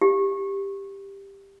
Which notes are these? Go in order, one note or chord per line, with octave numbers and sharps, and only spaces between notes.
G4